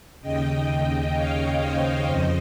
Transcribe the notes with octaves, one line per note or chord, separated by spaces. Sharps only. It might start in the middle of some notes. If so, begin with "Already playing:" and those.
D#2 C#3 D#5 G5
C#5 F5
C5 D#5
F2 C#3